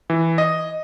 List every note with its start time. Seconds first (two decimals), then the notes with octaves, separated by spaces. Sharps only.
0.10 E3
0.38 D#5